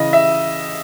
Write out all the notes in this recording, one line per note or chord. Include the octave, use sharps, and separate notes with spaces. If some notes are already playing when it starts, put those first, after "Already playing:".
Already playing: C#3 E3 D#5
E5